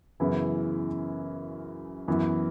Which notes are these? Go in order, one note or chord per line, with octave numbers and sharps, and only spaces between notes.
F#2 C#3 E3 B3 E4
F#2 E3 B3